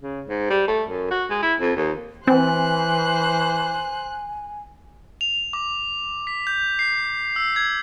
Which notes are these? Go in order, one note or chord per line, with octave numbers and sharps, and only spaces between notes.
C#3
G#2
G3
A3
F#2
F#4
G#3
E4
F2
D#2
E3 C4 C5 G#5 F#6
F7
D6
B6
G6
C7
E6
G#6